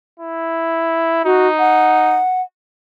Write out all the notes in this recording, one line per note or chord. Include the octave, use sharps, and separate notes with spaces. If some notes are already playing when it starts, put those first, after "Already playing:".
E4
D#4 F#4
F#5